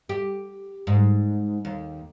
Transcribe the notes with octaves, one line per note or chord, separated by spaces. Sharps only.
G4
G#2
D#2